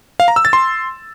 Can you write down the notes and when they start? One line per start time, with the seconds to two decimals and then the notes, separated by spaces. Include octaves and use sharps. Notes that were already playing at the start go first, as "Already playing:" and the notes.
0.20 F5
0.28 A#5
0.36 E6
0.45 A6
0.53 C6